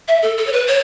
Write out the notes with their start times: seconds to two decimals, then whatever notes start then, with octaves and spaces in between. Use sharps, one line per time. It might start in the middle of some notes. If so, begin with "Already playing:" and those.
0.08 E5
0.22 A4
0.38 A4
0.47 C#5
0.52 B4
0.68 C#5